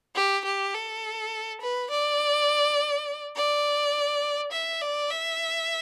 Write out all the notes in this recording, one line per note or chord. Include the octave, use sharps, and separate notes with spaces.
G4
G4
A4
B4
D5
D5
E5
D5
E5